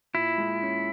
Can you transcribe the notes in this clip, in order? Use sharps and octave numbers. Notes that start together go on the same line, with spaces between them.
A#2 E4
G#3
C#4